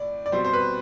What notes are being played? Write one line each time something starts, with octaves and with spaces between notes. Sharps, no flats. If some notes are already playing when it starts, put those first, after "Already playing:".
Already playing: A2 D5
D5
B2 G3 C4 C5
C5
B4